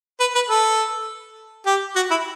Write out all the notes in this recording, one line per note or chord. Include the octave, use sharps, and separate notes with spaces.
B4
B4
A4
G4
F#4
E4